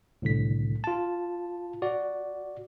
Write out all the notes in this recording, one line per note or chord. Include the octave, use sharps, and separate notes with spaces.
C2 A2 D3 B6
F4 A5
F#4 D5